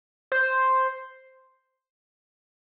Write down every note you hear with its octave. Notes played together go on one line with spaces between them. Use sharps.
C5